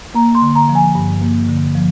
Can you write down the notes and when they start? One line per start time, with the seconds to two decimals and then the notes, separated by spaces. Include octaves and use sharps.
0.15 A#3 A#5
0.35 C6
0.42 D3
0.55 A#5
0.69 F3
0.75 G#5
0.95 G2
1.22 A#3
1.49 D3
1.75 F3